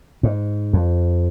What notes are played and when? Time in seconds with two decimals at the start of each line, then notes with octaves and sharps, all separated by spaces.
0.23 G#2
0.73 F2